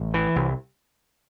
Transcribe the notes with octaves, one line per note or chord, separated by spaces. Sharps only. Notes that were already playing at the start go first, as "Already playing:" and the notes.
Already playing: A1
E3
C2